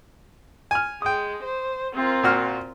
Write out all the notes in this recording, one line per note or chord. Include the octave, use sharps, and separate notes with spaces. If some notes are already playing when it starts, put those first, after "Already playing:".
G#5 F6
G#3 G5 D#6
C5
C4 F4 A#4
A#2 F#4 F6